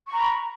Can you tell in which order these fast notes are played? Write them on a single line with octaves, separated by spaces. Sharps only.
C#6 A#5 B5